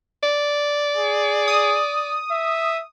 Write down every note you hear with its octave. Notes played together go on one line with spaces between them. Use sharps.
D5
G#4
D#6
E5